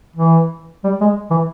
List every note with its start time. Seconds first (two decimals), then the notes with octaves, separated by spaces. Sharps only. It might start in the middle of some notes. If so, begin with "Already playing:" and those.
0.16 E3
0.84 G3
1.01 G#3
1.30 E3